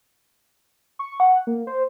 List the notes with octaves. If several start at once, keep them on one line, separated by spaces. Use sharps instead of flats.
C#6
F#5
A#3
C5